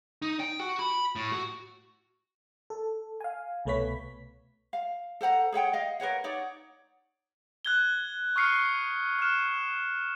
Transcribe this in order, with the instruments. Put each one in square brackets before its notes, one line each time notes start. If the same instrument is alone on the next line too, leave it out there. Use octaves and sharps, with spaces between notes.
[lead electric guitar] D#4
G5
F#4
B5
A2
F#4
[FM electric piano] A4
F5 G#5
C2 B2 A3 B4 C#5 B6
[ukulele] F5
A4 C5 F#5 A#5
G#4 C#5 F#5 G5
D#5 F5
A#4 B4 C#5 F#5
D#4 C#5 D5 F#5
[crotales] F#6 G#6 G7
C#6 D#6 F6 C7 C#7
F6 F#6 E7